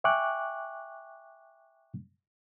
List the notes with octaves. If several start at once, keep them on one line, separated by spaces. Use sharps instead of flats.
E5 G5 G#5 C#6 D6 F#6